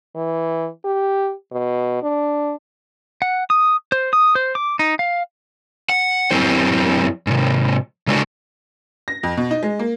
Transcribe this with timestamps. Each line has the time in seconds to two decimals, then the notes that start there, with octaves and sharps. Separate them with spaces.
0.15 E3
0.84 G4
1.51 B2
2.03 D4
3.22 F#5
3.50 D#6
3.92 C5
4.13 D#6
4.35 C5
4.55 D6
4.79 D#4
4.99 F5
5.89 F#5
6.31 F#2 F#3 C4 E4 G4 C5
7.27 G#2 C3
8.07 C#3 G#3 A3 D4 F#4 B4
9.08 A#6
9.23 F2
9.37 B2
9.51 D#4
9.63 G#3
9.79 A#3